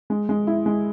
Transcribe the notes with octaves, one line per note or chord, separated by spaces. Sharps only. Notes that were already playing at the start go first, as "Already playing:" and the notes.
G#3
G#3
E4
G#3